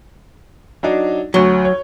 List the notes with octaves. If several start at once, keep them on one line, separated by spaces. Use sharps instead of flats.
F#3 D4 D#4
D2 F#3 C#6 G7
C#5